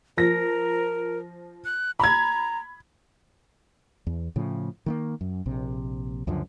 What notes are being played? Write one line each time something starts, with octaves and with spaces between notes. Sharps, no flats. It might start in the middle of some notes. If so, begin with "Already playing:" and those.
F3 A#4 A#6
F#6
A#5 B5 G#6
E2
A2 C#3 F3
D#3 A3 A#3
F#2
A#1 C3
C#2 F#2 D3 F3